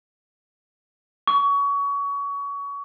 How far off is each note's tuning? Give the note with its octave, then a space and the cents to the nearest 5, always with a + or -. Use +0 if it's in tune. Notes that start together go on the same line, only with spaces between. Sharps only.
C#6 +25